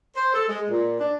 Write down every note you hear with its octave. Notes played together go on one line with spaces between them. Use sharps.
C5
A4
G#3
A#2
D4